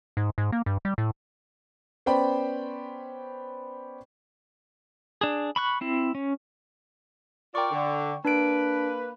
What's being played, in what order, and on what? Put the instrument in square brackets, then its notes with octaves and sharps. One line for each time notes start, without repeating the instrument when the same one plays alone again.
[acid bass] G#2
G#2
A#3
G2
G3
A2
[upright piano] B3 C#4 C5 D5 G5 B5
[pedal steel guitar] D4 G#4
B5 C#6 F#6
C4 E4
C#4
[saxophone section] F4 A#4 D5 [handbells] G5 C#6
[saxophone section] D3
[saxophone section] A#3 B4 [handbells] D4 D7